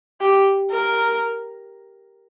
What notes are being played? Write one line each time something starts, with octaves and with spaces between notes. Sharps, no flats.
G4
A#4